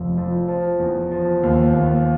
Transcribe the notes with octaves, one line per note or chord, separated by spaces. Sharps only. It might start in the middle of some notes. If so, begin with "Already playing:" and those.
Already playing: F1 F2
F2
F3
E2
F3
D#2
D#2